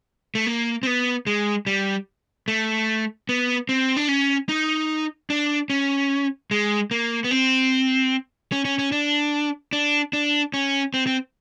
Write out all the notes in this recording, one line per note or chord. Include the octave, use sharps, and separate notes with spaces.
A3
A#3
C4
B3
G#3
G3
A3
B3
C4
D4
C#4
D#4
D4
C#4
G#3
A#3
B3
C4
C#4
C#4
C#4
D4
D4
D4
C#4
C4
C4